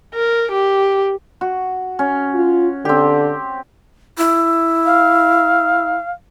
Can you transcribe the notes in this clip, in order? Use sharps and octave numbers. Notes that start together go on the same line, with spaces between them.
A#4
G4
F#4
C#4
F4
D3 C4 G4
E4
F5